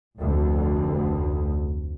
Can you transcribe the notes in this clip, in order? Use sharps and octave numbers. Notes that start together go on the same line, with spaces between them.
F1 D2